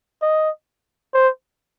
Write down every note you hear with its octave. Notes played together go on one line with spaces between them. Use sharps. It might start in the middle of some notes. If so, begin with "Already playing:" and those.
D#5
C5